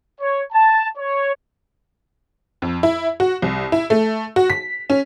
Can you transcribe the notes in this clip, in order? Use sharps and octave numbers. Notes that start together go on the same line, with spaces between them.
C#5
A5
C#5
F2
E4
F#4
C2
E4
A3
F#4
B6
C#4